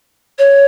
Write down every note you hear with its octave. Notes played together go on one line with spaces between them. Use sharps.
C#5